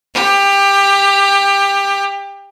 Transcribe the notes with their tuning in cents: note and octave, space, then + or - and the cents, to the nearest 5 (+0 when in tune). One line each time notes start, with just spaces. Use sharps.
G4 +20